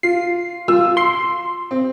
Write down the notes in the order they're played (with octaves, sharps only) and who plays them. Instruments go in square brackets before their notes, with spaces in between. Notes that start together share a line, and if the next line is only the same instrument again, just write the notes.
[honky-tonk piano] F4 [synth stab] C7
[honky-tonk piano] F4 E6
[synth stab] C6 [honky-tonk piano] C7
[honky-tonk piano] C4